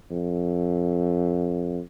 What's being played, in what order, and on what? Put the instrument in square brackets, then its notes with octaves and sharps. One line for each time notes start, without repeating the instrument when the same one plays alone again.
[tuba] F2